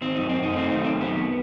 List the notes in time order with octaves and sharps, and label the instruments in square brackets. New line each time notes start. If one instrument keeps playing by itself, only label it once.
[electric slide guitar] D#3 C4
F#2 D#4
C4
F#2
D#4
A3 C4
D#3 D#4
F#2 C4
F#3 B3